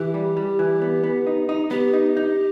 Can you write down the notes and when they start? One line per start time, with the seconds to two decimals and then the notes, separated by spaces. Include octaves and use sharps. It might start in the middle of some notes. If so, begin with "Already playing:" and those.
Already playing: E3 G4
0.14 G3
0.37 G3
0.59 E3
0.81 B3
1.03 B3
1.27 D#4
1.49 D#4
1.71 B3 G4
1.93 D#4
2.17 D#4